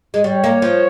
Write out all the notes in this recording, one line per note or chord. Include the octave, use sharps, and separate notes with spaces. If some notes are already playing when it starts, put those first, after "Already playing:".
G#3
G3 C#5
A#3
F3